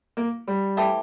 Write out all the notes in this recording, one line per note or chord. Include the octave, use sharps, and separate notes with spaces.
A#3
G3
E3 A3 C4 G4